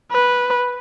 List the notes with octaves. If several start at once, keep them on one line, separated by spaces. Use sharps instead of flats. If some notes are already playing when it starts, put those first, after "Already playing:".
B4